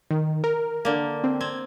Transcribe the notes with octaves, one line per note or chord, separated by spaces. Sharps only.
D#3
A#4
D3 A#3
C4
C4 G#6